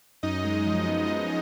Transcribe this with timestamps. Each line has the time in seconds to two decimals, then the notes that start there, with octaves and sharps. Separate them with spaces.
0.23 F#2 D#4 D#5
0.44 G#3
0.67 F3
0.88 B3